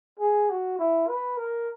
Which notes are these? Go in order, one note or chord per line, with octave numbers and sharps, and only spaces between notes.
G#4
F#4
E4
B4
A#4